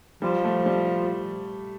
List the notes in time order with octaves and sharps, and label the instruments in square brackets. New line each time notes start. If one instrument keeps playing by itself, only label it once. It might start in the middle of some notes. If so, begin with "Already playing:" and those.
[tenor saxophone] F3 [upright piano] G3
[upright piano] A3
G3